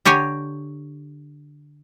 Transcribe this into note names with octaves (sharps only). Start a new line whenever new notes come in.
D3 G4 C#5 G#5 A#5